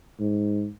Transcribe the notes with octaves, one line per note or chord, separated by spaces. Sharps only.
G#2